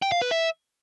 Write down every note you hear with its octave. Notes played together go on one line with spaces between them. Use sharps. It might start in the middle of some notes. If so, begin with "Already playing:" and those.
G5
F5
B4
E5